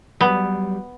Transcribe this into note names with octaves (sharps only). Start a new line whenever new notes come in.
F#3 G3 B3